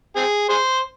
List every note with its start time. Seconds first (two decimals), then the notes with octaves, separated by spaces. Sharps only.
0.16 C4 G#4
0.49 G#4 C5